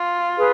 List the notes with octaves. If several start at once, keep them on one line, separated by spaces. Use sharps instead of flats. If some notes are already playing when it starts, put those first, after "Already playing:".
Already playing: F4
G#4 B4